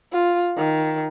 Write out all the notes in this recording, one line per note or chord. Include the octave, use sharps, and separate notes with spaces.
F4
D#3